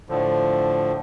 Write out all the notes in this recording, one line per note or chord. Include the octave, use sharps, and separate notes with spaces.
A2 D3 F3